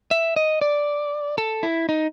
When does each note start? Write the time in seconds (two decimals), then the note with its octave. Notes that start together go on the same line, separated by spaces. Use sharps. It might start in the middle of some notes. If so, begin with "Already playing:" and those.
0.11 E5
0.36 D#5
0.61 D5
1.38 A4
1.63 E4
1.89 D#4